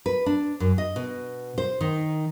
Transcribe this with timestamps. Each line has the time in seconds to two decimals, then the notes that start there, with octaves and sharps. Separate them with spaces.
0.06 B4
0.26 D4
0.60 F#2
0.78 D#5
0.96 B2
1.58 C5
1.81 D#3